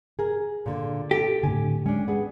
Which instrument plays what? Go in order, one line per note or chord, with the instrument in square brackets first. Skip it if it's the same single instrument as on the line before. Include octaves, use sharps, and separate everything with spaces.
[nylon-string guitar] G#4 A#4
A#2 D3
[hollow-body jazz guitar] G4 [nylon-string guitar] A4
[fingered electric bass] A2 D3 [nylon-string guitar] G#5
[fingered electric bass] G#3 [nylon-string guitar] C#4 D4
[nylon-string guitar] B3 G#4